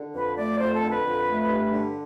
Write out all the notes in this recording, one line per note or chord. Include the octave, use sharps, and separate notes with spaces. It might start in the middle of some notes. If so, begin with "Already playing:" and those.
Already playing: D3
F2 B4
A3 D5
F2 C5
A4
D3
B4
F2
A3
G2
D3